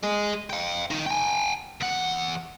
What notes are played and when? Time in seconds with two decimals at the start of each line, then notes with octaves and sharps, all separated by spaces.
0.03 G#4 D#5
0.50 F5 G5
0.91 D#4 A#4
1.06 G5 G#5
1.81 E2 F#5